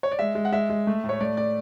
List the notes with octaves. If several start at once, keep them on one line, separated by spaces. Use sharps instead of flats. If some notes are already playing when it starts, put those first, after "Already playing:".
C#5
D5
G#3 E5
G#3
F#5
G#3 E5
G#3
A3
A2
C#5
A3 D5
A3 D5